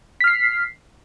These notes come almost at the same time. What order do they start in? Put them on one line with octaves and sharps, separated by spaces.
B6 F6 C7